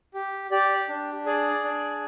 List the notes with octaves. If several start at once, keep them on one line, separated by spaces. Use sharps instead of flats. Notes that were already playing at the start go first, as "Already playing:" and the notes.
G4
G4 D5
D4
G#4 D5
D4